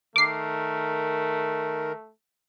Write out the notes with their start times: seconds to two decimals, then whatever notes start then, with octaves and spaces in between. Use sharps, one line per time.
0.16 D#3 A3 A#4 D6 C7